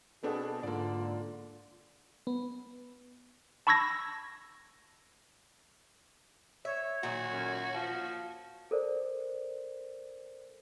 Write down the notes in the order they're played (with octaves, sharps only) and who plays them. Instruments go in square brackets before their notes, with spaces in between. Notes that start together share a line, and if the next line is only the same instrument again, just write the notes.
[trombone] B2 [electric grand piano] B3 C4 D4 [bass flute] G#4 [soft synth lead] A4
[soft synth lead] G#2 [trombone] D3 [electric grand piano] A#3 D5 [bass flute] F4
[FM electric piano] B3
[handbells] A5 B5 C#6 E6 G#6 A#6
[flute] C#5 [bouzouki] E5
[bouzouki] A#2 D#3 F#3 [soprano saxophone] F#4
[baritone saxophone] F#2
F3
[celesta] A4 A#4 C5 D5